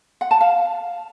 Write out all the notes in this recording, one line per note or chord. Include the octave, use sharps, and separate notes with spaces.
F#5
A5
F5